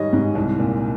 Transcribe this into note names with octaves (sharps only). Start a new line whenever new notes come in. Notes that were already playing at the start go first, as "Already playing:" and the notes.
Already playing: G#2 D#3 G3 C#5 D#5
G#2
C2
A#2